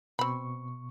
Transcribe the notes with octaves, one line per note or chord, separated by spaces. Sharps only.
B2 C4 B5 C#6